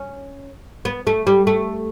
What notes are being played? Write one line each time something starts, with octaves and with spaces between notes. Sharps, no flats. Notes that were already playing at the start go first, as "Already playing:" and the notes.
Already playing: C#4
B3
A3
G3
A3